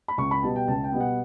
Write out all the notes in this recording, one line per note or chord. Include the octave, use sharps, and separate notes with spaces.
B5
C#2 C#6
B5
B2 G3 B3 A5
G5
C#2 A5
G5
B2 G3 B3
F#5